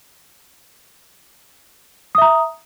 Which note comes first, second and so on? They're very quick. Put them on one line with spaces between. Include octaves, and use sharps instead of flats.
D#6 E5 A#5